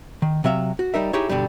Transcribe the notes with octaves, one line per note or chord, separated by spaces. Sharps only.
D#3
C3 F#3 E5 F5
F#4
G3 D#4 A#4 E5
D#4 E4 G4 G#4 C#5
G2 B2 D3 G3